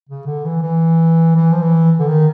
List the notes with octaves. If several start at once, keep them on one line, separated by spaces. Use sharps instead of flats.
C#3
D3
E3
E3
E3
F3
E3
D3
D#3